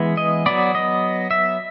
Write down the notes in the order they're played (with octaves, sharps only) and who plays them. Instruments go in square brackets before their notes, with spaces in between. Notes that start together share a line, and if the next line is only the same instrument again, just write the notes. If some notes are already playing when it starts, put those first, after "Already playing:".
Already playing: [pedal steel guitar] E3 G#3 B3
D#5
F#3 B3 D5
D#5
E5